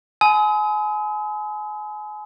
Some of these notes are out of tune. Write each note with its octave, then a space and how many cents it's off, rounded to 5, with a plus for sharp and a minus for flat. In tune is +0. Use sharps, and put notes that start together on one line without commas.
G#5 +30 B5 +45 D#6 +40